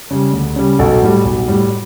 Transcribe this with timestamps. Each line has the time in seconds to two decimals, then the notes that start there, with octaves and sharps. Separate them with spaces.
0.11 C#3 G3
0.33 D2
0.56 C#3 G3
0.79 B1 F#4 A4
1.02 A2 G3
1.25 B1
1.48 A2 G3